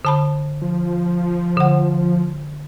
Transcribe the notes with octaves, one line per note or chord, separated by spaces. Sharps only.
D3 A5 B5
F3
D3 F#5